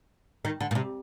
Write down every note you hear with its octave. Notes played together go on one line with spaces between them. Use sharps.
D#3
D3
A#2
C3